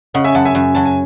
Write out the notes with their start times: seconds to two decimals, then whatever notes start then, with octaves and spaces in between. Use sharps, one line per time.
0.14 C#3 D#5 F#5
0.24 E5 G#5
0.35 F#2 F#5 A5
0.45 E5 G#5
0.55 F#2
0.75 F#3 A5
0.85 G#5